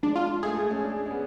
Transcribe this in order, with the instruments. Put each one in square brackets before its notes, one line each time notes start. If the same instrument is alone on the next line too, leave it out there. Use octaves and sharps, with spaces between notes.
[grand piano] G#3 [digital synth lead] D4
[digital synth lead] F4
[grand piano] A3 [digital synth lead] G#4
[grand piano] A3
C#4
D4
C#4
B3